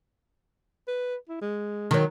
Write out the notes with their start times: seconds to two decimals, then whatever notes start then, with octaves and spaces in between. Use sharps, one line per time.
0.88 B4
1.29 E4
1.41 G#3
1.91 D#3 F#3